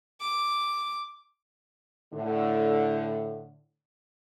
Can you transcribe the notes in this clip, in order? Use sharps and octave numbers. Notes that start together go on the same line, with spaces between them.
D6
A2 D3